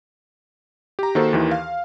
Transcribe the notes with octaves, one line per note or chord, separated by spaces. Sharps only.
G4 A#5
D#3 A#3 F#4 A4 C5
D#2 D#3 E3
F5